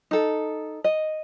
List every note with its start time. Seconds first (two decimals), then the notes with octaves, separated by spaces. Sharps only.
0.11 D#4 A4
0.84 D#5